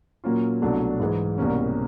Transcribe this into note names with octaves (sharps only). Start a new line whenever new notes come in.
A#2 F#3 A#3 C#4 F4
C2 B2 F#3 A3 D4
G#2 E3 G#3
C2 B2 G3 A#3 C#4